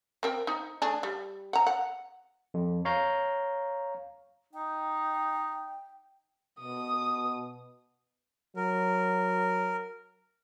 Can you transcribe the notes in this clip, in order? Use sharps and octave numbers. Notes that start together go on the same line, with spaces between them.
C4 A#4 G5
D#4
A3 D4 G#4
G3
F#5 A#5
F#5
F2
C#5 F5 A#5 F6 G6
D#4 G5
B2 D#6
F#3 A#4